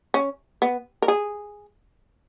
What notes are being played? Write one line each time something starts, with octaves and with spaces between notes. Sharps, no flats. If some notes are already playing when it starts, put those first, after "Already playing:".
C#4
B3
A#4
G#4